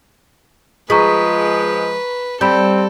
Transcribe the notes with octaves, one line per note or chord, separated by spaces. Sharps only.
F3 G#3 G#4 B4 A#5 C#6 B6
G3 C4 A4 B5 G6